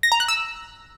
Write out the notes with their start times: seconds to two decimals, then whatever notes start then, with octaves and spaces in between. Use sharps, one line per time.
0.03 A#6
0.12 A#5
0.20 F#6
0.28 E6